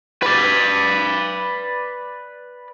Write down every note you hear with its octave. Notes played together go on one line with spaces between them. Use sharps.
B4 D5